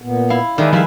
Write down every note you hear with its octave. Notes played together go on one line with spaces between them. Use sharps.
A#2 B3
E4 F5
D#3 G#3 B4 D5 E5
F3 G3 E4 G#4 E5 F5 B5